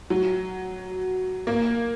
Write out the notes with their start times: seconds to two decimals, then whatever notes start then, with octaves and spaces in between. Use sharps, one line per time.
0.10 F#3
1.47 A#3